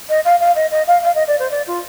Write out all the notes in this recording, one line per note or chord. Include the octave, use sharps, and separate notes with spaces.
D#5
F5
F5
D#5
D#5
F5
F5
D#5
D5
C5
D5
F4